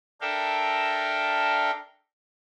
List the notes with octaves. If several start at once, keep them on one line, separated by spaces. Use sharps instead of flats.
D4 A4 A#4 E5 F5 G5